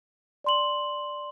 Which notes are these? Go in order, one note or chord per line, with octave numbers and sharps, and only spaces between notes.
D5 C6 F#7